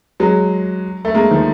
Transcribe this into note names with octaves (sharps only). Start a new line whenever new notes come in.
F#3 G#3
A3
G#3 A#3
D#3 F3